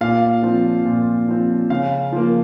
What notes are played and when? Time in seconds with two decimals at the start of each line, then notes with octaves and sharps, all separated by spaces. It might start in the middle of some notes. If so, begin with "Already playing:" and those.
0.01 A#2 F5
0.43 F3 C4
0.85 A#2
1.28 F3 C4
1.70 C#3 F5
2.12 F3 A#3